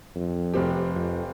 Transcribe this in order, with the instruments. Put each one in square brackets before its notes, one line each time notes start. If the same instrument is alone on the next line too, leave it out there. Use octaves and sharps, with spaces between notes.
[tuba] F2
[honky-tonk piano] F1 C4 G4
[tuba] F2